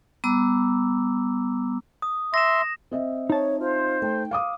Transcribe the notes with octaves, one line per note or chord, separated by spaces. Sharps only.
G3 B3 A#5 D6 E6
D#6
E5 C6 A#6 E7
C4 D#5 E5
D#4 C#5 A5
F4 C5
A3 G5
F5 D6 D#6